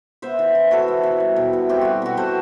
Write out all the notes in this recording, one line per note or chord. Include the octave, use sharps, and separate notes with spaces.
B3 C5 E5
E3
E3
E4 F#4 A4
B3
E3
G3
B2
E4
C4 E4 G4
G3 F#4
B2 F#4
B3 A4 C5